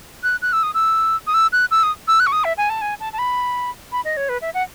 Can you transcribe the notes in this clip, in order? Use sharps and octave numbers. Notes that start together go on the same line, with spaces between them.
F#6
F#6
E6
D#6
E6
D#6
E6
F#6
E6
D#6
E6
F#6
C#6
D#6
E5
G#5
A5
G#5
A5
A5
B5
B5
D#5
C#5
B4
E5
F#5